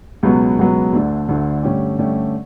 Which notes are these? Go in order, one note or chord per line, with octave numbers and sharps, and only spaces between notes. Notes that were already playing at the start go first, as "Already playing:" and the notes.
C#2 B2 F#3 B3
C#2 B2 F#3 B3
D2 D3 A3 D4
D2 D3 A3 D4
G2 D3 A3 C#4 G4
G2 D3 A3 C#4 G4